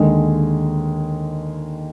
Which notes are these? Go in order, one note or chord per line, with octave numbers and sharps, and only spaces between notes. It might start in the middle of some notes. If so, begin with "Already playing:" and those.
Already playing: D#2 D3 G#3